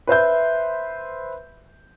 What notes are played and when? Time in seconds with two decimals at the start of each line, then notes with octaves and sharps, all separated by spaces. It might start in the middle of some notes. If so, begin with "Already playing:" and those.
0.07 B4 C5 E5 G6